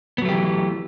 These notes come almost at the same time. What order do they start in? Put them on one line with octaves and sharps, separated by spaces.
B3 F#3 A3 G4 E3